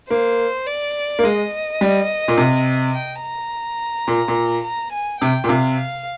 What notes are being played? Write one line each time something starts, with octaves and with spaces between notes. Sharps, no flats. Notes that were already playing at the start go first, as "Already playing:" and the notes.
A#3 C5
D5
A#3
G#3 D#5
G3
A#2
C3
G5
A#5
A#2
A#2
A#5
G#5
C3 G5
A#2
C3 F5
F5